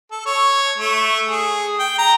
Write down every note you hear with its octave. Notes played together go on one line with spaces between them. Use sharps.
A4
C#5
A3
G#4
G5
A#5